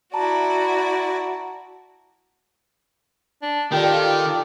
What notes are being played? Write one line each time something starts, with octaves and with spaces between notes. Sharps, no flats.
E4 F#4 D5 A5 A#5
D4
D#3 F4 G4 A4 B4 D5 G5